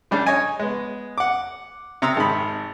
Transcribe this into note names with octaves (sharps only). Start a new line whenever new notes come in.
C#3 G3 D4
C#5 D#5 G#5
G#3 B3
F#5 D6
C3 A#5 D#6 E6
G#1 D#3 B5